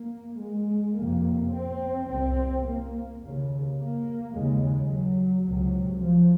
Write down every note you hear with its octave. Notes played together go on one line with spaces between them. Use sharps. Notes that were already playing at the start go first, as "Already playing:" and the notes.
Already playing: A#3
G#3
F2 C3 A#3
C4
C2 C3 C4
A#3
D#2 C#3
A#3
D#2 C#3 G#3
G#3
F#3
C#2 C3 F#3
F3